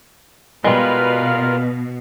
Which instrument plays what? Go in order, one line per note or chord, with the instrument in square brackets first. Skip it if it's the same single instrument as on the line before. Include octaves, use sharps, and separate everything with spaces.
[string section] B2 [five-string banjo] G3 G#3 [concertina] F4 A#4 [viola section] B4 F5